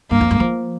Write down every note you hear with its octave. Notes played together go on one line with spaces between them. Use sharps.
G2 A#3
F2
G2
F3